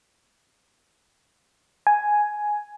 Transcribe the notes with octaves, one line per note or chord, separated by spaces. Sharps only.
G#5